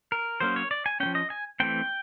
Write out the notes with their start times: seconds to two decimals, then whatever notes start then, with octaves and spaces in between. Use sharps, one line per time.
0.12 A#4
0.40 F#3 A#3 C#4 C5
0.56 C#5
0.71 D5
0.86 G#5
1.00 A#3 C#4 G5
1.05 F3
1.15 D#5
1.30 G#5
1.60 E3 A3 C4 G5